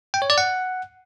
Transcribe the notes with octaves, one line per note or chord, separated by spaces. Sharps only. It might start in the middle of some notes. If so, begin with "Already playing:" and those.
G5
C#5
D5
F#5